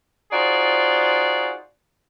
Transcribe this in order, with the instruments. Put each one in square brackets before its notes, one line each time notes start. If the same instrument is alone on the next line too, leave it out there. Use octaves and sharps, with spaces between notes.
[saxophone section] D#4 F4 F#4 G#4 C5 D5